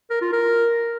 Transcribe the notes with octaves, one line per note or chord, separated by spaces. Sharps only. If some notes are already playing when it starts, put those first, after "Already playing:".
A#4
F4
A#4